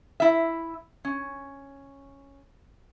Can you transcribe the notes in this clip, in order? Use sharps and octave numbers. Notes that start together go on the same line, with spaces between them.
E4 E5
C#4